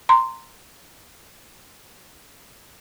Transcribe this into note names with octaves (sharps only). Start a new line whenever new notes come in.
A#5 C6